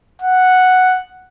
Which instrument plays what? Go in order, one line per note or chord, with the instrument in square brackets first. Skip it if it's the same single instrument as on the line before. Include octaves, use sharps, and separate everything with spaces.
[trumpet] F#5